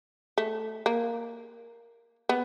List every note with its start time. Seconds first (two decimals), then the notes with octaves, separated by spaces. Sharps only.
0.38 A3
0.86 A#3
2.29 B3